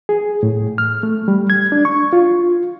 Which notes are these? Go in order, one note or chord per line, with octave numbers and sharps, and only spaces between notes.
G#4
A2
F6
A3
G3
G#6
D4
C#6
F4